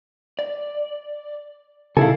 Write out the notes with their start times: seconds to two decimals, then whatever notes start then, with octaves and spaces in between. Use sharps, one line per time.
0.39 D5
1.97 B1 C#3 E4 A4 F5 G#5